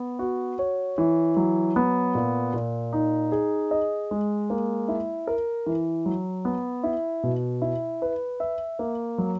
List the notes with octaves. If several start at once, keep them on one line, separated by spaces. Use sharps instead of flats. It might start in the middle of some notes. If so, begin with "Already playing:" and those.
Already playing: B3
F#4
C#5
E3
F#3
B3
A#2
A#2
D#4
G#4
D#5
G#3
A#3
E4
A#4
E3
F#3
B3
E4
B2
E4
B4
E5
A#3
F#3